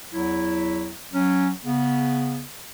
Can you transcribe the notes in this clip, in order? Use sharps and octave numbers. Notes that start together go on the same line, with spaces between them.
E2 F#3 E4
F#3 C#4
C#3 B3